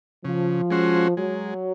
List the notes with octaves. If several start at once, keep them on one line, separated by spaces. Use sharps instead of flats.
C#3 F3
G#3 C#4 F#4 C5
F#3 G#3